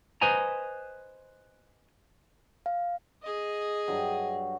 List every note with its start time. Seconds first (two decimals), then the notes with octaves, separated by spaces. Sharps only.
0.21 B4 C5 D#5 G#5 A#5
2.66 F5
3.23 G#4 D#5
3.88 G2 F#3